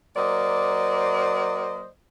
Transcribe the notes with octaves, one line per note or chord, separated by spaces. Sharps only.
F#3 A#3 C5 D5 D#5